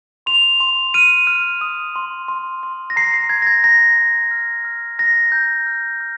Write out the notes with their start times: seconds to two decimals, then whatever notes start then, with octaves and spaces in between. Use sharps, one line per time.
0.26 C6 F7
0.60 C6
0.94 F6 D#7
1.27 F6
1.61 D#6
1.96 C6
2.28 C6
2.63 C6
2.90 A#6
2.96 A#5 C7
3.14 C7
3.30 A#5 G#6
3.42 A#6
3.47 G#6
3.64 A#5 A#6
3.98 A#5
4.31 F6
4.65 F6
4.99 A#5 A#6
5.32 A#5 G6
5.67 F6
6.01 F6